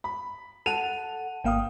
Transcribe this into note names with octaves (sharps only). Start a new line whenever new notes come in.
B5
A4 F#5 A5 D#7 F7
G#1 A#3 F5 G5 D#6